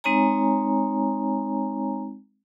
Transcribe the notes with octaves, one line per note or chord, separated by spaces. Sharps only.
G#3 C4 D#4 C#5 G#5 A#5